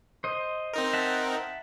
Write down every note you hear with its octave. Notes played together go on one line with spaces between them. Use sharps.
C5 D#5
C4 D#4 A#4
E5 F#5 A5